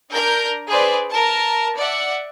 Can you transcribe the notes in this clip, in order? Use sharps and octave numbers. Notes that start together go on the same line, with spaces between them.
D4 A#4 A#5 G6
G#4 B4 C5 D5
A#4 A5
D5 E5 F#5